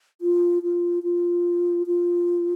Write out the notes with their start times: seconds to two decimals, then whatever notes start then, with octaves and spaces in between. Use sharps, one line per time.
0.21 F4
0.63 F4
1.03 F4
1.87 F4